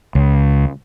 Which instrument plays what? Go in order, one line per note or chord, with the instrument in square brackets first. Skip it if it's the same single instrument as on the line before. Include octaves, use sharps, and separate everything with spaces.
[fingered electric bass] C#2